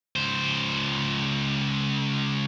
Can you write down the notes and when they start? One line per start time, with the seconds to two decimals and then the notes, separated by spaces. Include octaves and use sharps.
0.16 C#2 C5